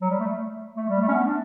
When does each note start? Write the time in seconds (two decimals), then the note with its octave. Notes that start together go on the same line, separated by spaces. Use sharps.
0.01 F#3
0.10 G3
0.19 A3
0.76 A3
0.89 G3
1.02 A3
1.08 C#4
1.14 B3
1.27 D4